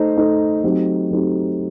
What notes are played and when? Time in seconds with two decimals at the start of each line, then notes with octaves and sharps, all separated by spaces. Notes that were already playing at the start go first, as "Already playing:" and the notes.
Already playing: A3 D#4 A4 C5
0.17 A3 D#4 A4 C5
0.64 F#3 A3 C4 D#4 G4
1.11 F#3 A3 C4 D#4 G4